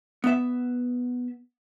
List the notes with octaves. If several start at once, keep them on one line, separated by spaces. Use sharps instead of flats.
B3 E5